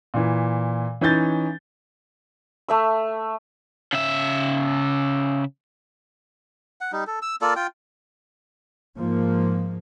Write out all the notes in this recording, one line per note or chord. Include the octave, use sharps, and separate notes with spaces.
A#2 E3
E3 C#4 D#4 G6 A6
A3 E5 E6
C#3 E5
F#5
G3 D#4
A4
E6
A#3 F4 A4 D5
F4 G5
G#2 F3 A#3